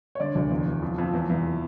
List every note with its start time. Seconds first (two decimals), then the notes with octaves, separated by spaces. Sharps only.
0.15 C#5
0.20 D3 D5
0.35 D2
0.50 E2
0.66 E2
0.82 F2
0.98 F2
1.13 E2
1.29 E2